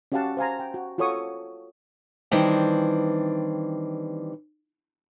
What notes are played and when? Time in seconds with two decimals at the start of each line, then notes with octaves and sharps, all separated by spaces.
0.12 C#4 F#4 G4 F5 F#5 A5
0.37 C5 F5 G#5 A#5
0.59 G5
0.74 F#4
0.98 F4 F#4 A4 C#5 C#6 D#6
2.31 D#3 E3 G3 C4 D4